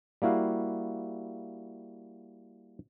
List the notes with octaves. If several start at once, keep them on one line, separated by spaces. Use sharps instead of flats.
G3 A#3 E4 F#4 F5